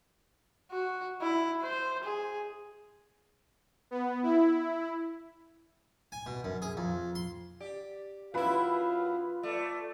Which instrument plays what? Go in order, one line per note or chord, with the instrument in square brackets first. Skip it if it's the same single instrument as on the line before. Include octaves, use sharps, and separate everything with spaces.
[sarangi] F#4
E4
C5
G#4
[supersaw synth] B3
E4
[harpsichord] G#5
B2
F#2
G#4
F2
C6
[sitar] G4 [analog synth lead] D5
[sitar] F#2 E4 [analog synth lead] F4 [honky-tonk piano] B4 B5 [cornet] F5
[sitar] A3 [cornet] D5